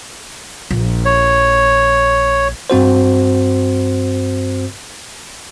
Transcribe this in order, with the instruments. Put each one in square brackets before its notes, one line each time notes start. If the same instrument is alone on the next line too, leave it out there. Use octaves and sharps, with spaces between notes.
[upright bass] A#1
[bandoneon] C#5
[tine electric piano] G2 C4 F#4 C5